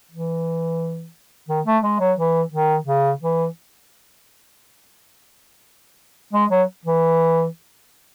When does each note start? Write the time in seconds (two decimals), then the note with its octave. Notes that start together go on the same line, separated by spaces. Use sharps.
0.11 E3
1.48 D#3
1.66 A3
1.83 G#3
2.00 F#3
2.18 E3
2.52 D#3
2.87 C#3
3.22 E3
6.33 G#3
6.50 F#3
6.85 E3